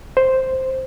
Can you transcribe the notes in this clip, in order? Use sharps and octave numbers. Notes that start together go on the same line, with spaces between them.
C5